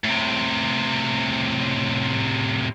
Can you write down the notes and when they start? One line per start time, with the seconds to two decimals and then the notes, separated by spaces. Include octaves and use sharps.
0.04 A2 C3